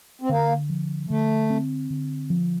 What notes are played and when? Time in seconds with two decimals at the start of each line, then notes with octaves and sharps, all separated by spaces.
0.21 C4
0.29 D3 A#3
0.69 F3
1.09 D3 A3
1.50 C4
1.90 D3
2.30 F3